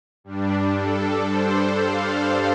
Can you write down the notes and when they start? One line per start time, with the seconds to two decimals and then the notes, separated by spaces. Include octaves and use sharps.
0.24 G2 G3 D4
0.76 A4
1.28 C5
1.80 F5